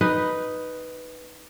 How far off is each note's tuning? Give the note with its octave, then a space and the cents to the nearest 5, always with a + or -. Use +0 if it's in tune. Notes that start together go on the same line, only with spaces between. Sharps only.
D#4 +0 B4 +0